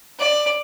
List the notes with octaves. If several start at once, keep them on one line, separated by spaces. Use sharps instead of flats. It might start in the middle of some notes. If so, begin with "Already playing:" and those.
D5